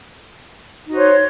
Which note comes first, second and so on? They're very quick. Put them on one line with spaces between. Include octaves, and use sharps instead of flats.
D#4 F#4 C5 C#5